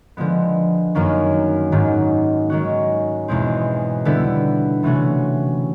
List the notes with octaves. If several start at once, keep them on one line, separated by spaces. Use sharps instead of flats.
D3 F3 G#3 B3
F#2 D#3 F#3 A#3 C#4
G#2 D#3 F#3
D#3 G#3 C#4 F#4
E2 B2 G#3 C4
D3 G3 B3 E4
C3 E3 A3 C#4 F#4